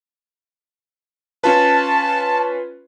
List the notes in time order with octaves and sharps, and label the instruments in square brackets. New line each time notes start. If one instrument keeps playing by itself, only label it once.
[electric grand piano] C#4 F4 B4 [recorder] A5